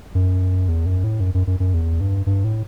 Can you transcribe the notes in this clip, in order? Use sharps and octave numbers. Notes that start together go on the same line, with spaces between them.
F#2
E2
F#2
A2
F#2
F#2
F#2
F#2
E2
G2
G2
A2